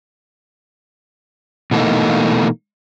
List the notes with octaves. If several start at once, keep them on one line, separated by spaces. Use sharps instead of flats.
B2 E3 A3 A#3 D#4